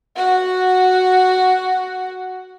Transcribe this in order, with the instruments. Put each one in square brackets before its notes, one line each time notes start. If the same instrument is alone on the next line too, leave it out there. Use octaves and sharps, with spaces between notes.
[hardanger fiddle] F#4 F#5